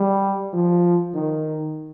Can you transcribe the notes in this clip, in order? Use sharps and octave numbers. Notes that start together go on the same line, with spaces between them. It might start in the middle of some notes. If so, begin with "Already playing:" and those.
Already playing: G3
F3
D#3